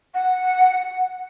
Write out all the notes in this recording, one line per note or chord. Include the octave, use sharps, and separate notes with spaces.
F#5